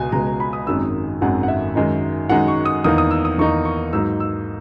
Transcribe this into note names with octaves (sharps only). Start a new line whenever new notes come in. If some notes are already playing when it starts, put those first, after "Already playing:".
Already playing: C#2 B2 G#3 G#5
C#2 B2 G#3 A#5
A#5
B5
D#6
G#1 F#2 D#3 G#3 E6
G#1 F#2 D#3 G#3 F#5
F#5
E5
F#2 D#3 G#3 D#4
F#2 D#3 G#3 D#4 F#5
C#6
D#6
E2 D#3 A#3 D#4 D#6
D#6
E6
D#6
E2 D#3 A#3 D#4 C#6
C#6
G#2 F#3 A#3 D#4 E6
E6